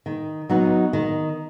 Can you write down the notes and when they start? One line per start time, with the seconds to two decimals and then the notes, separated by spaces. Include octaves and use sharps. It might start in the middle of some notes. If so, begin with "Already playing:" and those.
0.06 D#3
0.49 F#3 B3 D#4 F#4
0.93 D#3